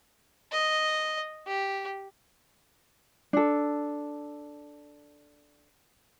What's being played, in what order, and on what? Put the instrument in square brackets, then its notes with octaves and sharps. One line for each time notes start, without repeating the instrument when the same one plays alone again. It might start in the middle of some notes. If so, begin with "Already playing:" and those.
[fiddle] D#5
G4
[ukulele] D4 A4